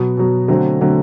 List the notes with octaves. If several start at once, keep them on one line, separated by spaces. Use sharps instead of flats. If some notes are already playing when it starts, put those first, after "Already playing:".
Already playing: B2 F#3 B3
B2 F#3 B3
D3 F#3 A3 C4
D3 F#3 A3 C4